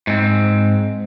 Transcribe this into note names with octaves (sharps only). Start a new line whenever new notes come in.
G#2 C4